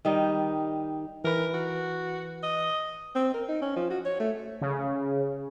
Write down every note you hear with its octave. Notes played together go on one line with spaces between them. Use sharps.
D#3 G3 D#4
E3 A#4 B4
F#4
D#5
C4
A#4
D#4
C#4
F3
F#4
C#5
A3
C#3